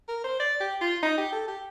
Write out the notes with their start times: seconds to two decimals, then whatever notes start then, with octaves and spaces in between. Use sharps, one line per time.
0.08 A#4
0.24 C5
0.40 D5
0.60 G4
0.81 F4
1.02 D#4
1.18 G4
1.32 A4
1.48 G4